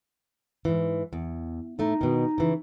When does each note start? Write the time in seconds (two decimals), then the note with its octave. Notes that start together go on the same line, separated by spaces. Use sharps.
0.65 G#2 E3
1.13 E2
1.79 A2 A3 D#4
2.01 B2 D#3
2.38 C#3 E3